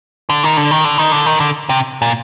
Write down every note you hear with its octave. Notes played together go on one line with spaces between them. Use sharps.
D3
D#3
D3
D#3
D3
D#3
D3
D#3
D3
C3
A#2